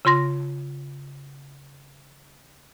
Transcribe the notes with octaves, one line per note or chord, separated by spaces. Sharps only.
C#3 F4 C6 A#6